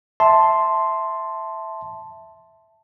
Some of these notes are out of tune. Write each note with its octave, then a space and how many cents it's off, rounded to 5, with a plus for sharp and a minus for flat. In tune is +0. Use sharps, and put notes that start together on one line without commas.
E5 +0 A5 +0 C6 +0